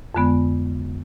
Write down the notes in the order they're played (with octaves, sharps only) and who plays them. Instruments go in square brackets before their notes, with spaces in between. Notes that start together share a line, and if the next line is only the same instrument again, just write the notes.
[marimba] F2 D3 G#3 B3